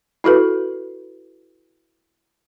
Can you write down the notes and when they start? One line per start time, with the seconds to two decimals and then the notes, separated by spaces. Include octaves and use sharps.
0.24 E4 F#4 A4 B4